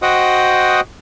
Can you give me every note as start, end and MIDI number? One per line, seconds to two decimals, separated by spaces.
0.02 0.80 66
0.02 0.80 72
0.02 0.80 75
0.02 0.80 78
0.02 0.80 79
0.02 0.80 87